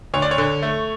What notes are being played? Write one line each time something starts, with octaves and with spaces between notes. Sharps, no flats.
D2 C#5
D5
C#5
D3
A3